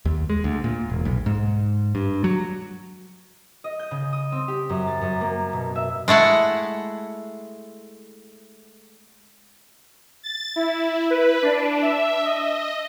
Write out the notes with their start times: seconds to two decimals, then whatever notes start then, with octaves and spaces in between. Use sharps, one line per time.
0.05 D#2
0.30 G#3
0.44 D2
0.64 A#2
0.90 E1
1.05 B1
1.26 G#2
1.95 G2
2.24 F#3
3.64 D#5
3.79 G6
3.91 C#3
4.12 D#6
4.32 C4
4.48 G4
4.69 F#2
4.87 A6
5.01 F#2
5.21 A#3
5.53 B2
5.76 E5
6.08 G#3 A3 E4 F#5
10.23 A6
10.56 E4
11.10 B4
11.42 D4
11.82 E5
12.25 D#5